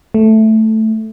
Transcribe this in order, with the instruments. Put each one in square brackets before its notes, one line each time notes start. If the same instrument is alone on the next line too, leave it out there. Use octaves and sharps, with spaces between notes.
[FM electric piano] A3